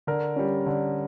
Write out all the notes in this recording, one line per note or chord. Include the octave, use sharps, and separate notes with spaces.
D3 A#4
G3 C#4
D3